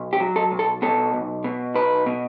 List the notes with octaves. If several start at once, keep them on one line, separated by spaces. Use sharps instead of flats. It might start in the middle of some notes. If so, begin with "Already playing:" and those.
Already playing: B1
G4
F#3
A4
B1
A4
B2 A4
B1
B2
B1 B4
B2